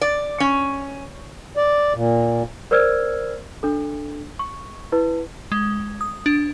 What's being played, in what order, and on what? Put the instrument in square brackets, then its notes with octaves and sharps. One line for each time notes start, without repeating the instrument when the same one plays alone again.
[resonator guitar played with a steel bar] D5
C#4
[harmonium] D5
A#2
[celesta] A#4 C5 D5 E6 F6 G#6
D4 A4
C#6
E4 B4
[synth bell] G#3
D#6
D4